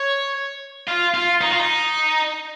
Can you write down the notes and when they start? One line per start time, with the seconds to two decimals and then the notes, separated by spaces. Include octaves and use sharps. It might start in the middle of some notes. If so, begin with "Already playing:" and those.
Already playing: C#5
0.88 F4
1.14 F4
1.41 D#4
1.50 F4
1.59 D#4